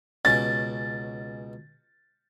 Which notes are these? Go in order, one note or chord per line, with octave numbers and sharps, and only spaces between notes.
C#2 B2 C#4 A6